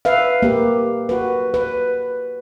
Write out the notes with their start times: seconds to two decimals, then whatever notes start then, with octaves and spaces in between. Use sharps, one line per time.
0.05 B4 E5 F5
0.42 A#3 G4
1.09 F#4 B4
1.54 B4